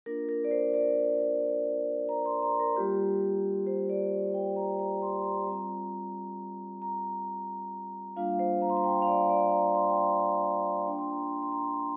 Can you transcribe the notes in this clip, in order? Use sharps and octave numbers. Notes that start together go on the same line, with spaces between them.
A#3 D4 F4 A#4
A#4
D5
C5
D5
A#5
C6
A#5
A#4
G3 A#3 F4 G4
C5
D5
G5
A#5
A#5
C6
A#5
G3 C4 F4
A#5
G3 A#3 D4 F4 F5
C5
A#5
C6
A#5
G5
F5
D5
D5
A#5
C6
G5
A#5
A#3 D4 F4 G5
C6
A#5
C6
A#5
C6